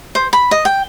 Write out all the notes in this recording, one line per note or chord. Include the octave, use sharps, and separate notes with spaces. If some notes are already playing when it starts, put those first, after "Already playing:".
C5
B5
D#5
G5